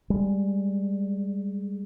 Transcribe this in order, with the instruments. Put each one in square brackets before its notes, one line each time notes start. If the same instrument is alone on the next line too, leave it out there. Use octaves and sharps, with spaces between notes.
[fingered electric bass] G3 G#3